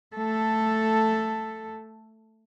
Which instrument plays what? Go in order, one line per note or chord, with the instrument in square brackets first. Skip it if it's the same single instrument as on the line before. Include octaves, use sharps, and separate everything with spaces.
[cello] A3 A4